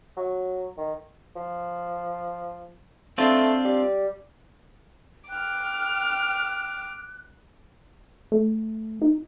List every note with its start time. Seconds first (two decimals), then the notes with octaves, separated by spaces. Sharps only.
0.17 F#3
0.77 D#3
1.36 F3
3.18 A3 C4 D4 F4
3.65 G3
5.30 G5 D6 F6 F#6
8.32 A3
9.02 D#4